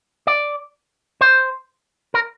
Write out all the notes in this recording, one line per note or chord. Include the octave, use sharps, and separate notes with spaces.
D5
C5
A#4